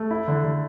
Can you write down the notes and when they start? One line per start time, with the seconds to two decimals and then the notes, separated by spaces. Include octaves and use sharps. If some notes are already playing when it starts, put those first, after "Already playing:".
Already playing: A3
0.11 E4
0.28 D3
0.44 D3